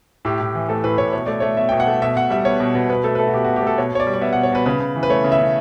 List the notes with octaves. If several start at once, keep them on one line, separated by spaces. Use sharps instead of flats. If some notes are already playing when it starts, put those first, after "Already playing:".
A2 G4
A2
E3
A3 A4
A2 B4
A2 C#5
B2 C#5
A3 D5
A3 C#5
B2 E5
B2 G5
F#5
A3
B2 E5
B2 F#5
G3 E5
B3 C#5
B2
B2
B2 B4
A3 A4
B4
A3 A4
F#4
B2 G4
B2 F#4
G4
A3 A4
B2 C#5
B2 C#5
D5
G3
D5
B3 E5
B2 F#5
C#5
B2 B4
C#3 B4
C#3
E3
B4
A3 C#5
C#3
E5
C#3